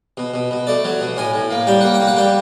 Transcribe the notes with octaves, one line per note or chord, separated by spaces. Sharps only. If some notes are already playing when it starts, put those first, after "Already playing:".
B2
B2
B2
A3 D5
F#3
B2
A2 G#5
A2
A#3
G3 G5
A#3 F#5
G5
A#3
F#5
G3 G5